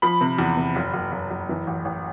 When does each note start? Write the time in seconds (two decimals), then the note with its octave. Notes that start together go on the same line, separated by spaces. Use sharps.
0.02 F3 B5
0.21 C3
0.38 E2
0.57 C3
0.76 F#1
0.94 F#1
1.12 F#1
1.31 F#1
1.49 E3
1.67 A1
1.85 A1